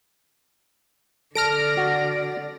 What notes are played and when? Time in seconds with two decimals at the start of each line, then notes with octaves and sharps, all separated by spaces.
1.35 D3 A4 D5 F6 A#6 D7
1.77 F#4